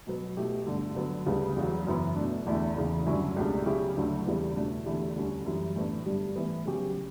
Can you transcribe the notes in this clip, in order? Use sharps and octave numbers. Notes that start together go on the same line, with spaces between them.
B2 F#3 B3
B2 A3 E4 G4
G2 D3 A3
D3 F#3 B3
D2 C#3 G3 B3
E2 C#3 F#3
F#2 E3 B3
B2 A3 D4
E2 D3 A3 E4
E2 C#3 E3
G2 D3 F#3 C#4 E4
C#2 B2 A3 D4 G4
C#3 F#3 C#4 E4 G4
D2 D3 F#3 A3 D4
E2 C#3 G3 B3 E4
B2 A3 D4
E2 D3 A3 E4 G4
D2 D3 G3 C#4
F#2 E3 G3
A2 E3 B3 D4
G2 D3 G3
A2 E3 B3
C#3 F#3 C#4 G4